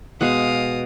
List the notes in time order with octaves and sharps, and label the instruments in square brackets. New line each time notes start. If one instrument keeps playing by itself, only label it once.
[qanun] B2 G#3 F#5 [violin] F5 D#6